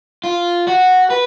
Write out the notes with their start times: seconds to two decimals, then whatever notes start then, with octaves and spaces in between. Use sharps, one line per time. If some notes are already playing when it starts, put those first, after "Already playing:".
0.24 F4
0.68 F#4
1.10 B4